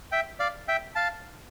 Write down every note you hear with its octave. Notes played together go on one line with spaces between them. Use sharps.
E5 G5
D5 F5
E5 G5
F5 A5